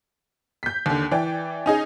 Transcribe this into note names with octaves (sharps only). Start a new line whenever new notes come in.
G6 B6
D#2 D3
E3 D5 G5
C#4 D#4 G#4